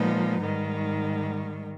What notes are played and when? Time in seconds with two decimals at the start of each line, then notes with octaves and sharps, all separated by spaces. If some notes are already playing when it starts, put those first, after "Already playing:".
Already playing: A#2 F3 G#3 B3 D#4
0.40 G#2 D#3 G3